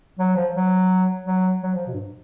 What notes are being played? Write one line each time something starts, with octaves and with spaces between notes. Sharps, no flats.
F#3
F3
F#3
F#3
F#3
F3
B2
G2